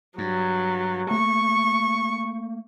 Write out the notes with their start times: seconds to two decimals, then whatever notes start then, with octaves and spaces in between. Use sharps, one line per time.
0.18 G2 F#3
1.11 A3 A#3 C#6